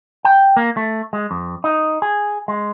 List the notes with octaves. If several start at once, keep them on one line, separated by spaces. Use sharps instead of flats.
G5
A#3
A3
G#3
F2
D#4
G#4
G#3